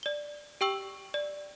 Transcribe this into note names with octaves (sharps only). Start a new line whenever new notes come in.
D5 G7
G4 G5 C#6 E6 F#7
D5